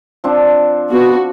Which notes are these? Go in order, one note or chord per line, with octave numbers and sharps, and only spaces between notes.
F3 C4 D4
B3 F#4